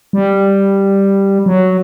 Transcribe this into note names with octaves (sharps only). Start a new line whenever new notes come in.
G3
F#3